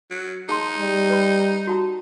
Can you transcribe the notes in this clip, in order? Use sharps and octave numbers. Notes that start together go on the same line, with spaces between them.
F#3
D#4 G#4 A5 C6
G3
B4 B5
F#4 A5 A#5